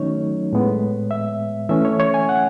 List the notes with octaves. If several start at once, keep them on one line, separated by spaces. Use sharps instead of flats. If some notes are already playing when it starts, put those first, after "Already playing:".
Already playing: D#3 F#3 A3 C#4 D#4 C#5
A2 G#3 B3
E5
E3 A3 C#4 E5
C#5
C#5
G#5
F#5